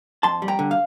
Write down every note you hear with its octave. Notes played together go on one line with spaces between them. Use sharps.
F2 A5 C6
G3
G5 A#5
D3
F5